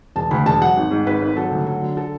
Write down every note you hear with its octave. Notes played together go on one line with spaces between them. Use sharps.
E1 A5
D2 B5
E1 A5
F#3 F#5
G#1
G#2
G#1 B4
G#1
F#3 A4
D2
F#3
D3
A4